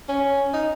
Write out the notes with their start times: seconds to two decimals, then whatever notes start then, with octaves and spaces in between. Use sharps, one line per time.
0.09 C#4
0.54 D#4